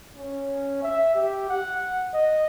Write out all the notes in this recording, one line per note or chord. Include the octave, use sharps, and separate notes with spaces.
C#4
E5
G4
F#5
D#5